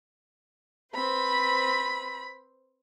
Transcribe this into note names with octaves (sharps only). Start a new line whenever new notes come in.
C4 B4 C5 B5